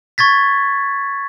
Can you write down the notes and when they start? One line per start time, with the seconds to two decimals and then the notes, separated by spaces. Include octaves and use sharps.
0.18 C#6 G#6 A6 B6